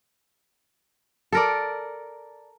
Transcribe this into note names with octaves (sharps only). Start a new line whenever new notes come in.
A4 A#4 D5